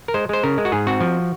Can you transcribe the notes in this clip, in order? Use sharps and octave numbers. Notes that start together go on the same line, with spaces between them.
A#4
G#3 C5
G#3 C5
C#3 A#4
G#3
F#4
G#2 G#4
C4 F#4
F3